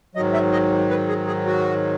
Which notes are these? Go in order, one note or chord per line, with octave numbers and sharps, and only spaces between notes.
G#2 D#3 F#3 D#5
E5
D#5
B4
G#4
G#4
F#4